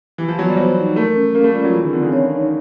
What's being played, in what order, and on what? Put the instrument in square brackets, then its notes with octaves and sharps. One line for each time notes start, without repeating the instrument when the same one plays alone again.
[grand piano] E3 [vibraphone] G4
[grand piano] F3
[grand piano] F#3 [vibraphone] B3
[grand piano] G3
[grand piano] F#3 [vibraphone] C5
[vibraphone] D#4
[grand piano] A3 [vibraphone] A#4
[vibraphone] C#4
[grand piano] A#3 [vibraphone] C#4
[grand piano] A3
[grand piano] G3 [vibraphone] F4
[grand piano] F#3
[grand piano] E3 [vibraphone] G#4
[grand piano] D#3
[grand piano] D3 [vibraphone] C4
[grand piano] C#3
[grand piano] D3 [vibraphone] C#5
[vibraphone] D#4